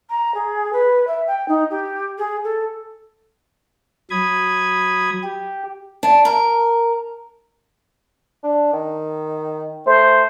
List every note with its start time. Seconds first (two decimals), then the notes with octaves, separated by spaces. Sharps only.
0.10 A#5
0.34 G#4
0.73 B4
1.07 E5
1.27 G5
1.48 D#4
1.71 G4
2.18 G#4
2.44 A4
4.10 F#3 B5 D#6 G#6
5.23 G4
6.03 D4
6.25 A#4
8.43 D4
8.73 D#3
9.86 A3 C5